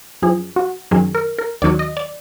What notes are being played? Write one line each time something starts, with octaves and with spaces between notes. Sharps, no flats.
F#2 F3 G#4
F#4
F#2 D#3 F#3 G#4
A#4
A#4
D#2 D#3 F#3 D5
D#5
D5